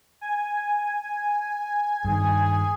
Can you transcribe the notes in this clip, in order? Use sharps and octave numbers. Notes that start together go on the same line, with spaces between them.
G#5
G2 D#3 G#4